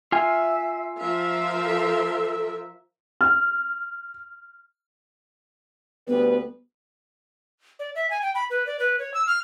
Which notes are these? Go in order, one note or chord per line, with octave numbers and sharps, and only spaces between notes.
F4 E5 G#5
F3 A#4 E5 F5
A4
F6
D2 G3 B3 B4
D5
E5
G#5
G5
B5
B4
D5
B4
C#5
E6
F6